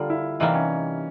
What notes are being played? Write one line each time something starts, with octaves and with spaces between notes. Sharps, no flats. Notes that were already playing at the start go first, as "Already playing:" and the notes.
Already playing: D3 G3 A#3 F4
E4
C3 E3 G3 A#3 D#4
C#4